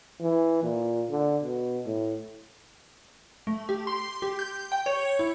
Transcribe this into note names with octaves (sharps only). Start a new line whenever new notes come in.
E3
A#2
D3
B2
A2
A3
G4
C6
G4
G6
G5
C#5
E4